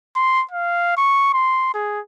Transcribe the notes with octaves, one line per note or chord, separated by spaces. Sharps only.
C6
F5
C#6
C6
G#4